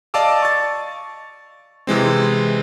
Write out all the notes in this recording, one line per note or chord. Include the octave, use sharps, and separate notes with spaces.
D5 D#5 F5 A5 D6 E6
C#6 A6
C3 E3 G#3 C4